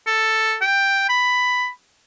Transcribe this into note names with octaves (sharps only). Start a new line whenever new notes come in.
A4
G5
B5